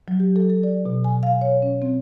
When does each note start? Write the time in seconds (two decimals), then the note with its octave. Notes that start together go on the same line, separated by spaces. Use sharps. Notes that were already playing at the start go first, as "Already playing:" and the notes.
0.08 F#3
0.20 G4
0.36 A4
0.50 A4
0.63 D5
0.85 B2
1.04 G#5
1.23 F5
1.41 C#5
1.62 C#4
1.82 C4